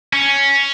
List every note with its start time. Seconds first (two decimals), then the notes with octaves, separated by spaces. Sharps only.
0.13 C#4